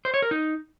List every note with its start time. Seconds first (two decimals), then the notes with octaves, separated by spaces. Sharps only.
0.05 C5
0.14 C#5
0.22 A#4
0.31 D#4